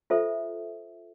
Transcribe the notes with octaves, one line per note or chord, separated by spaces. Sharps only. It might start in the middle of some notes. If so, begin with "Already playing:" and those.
F4 A4 C5 E5